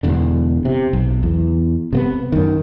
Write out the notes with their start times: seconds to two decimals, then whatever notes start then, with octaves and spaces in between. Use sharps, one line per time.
0.03 E1 B1 E2 D3
0.65 C3
0.93 B1
1.23 E2
1.93 C3 A#3 B3
2.32 F#2 D#3